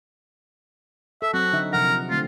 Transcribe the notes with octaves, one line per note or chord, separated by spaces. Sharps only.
A4 E5
F#3 C4 F#4
D3 D#4 E5
C3 F3 A#4 F#5
D3 A3 C4 F4